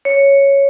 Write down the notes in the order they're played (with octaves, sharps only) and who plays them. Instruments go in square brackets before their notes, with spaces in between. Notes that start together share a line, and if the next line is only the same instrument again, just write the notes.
[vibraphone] C#5